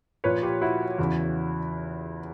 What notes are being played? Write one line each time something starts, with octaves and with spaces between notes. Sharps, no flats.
A#2 F3 B4 C#5
F4 G4
E4 F#4
E2 C#3 E3